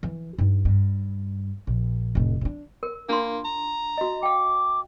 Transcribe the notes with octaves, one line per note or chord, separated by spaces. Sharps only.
E3
G2 D#4
G2
A#1
F1 A2
C3 D4
A#4
A#3 D4 F4 C6
A#5
F#4 D#5
F5 G5 D6